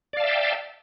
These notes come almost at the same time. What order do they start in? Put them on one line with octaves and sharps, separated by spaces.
D5 F5 A5 E5 G5